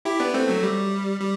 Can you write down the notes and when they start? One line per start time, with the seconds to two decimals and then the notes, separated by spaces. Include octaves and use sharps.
0.05 E4 G4
0.20 B3 D4
0.34 A3 C4
0.48 F#3 A3
0.63 G3
1.20 G3